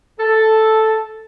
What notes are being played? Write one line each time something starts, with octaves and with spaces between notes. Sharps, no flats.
A4